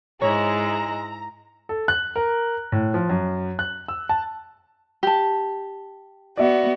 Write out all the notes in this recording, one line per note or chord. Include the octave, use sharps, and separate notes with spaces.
G#2 G#3 E4 C#5 A#5
A4
F#6
A#4
A2
F3
F#2
F#6
E6
A5
G4 A5
B3 F#4 D5 E5